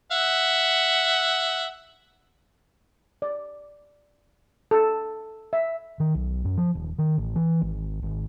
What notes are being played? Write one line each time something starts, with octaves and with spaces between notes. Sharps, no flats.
E5 F#5
D5
A4
E5
D#3
B1
F#2
F3
D#1
D#3
A1
E3
G#1
G#1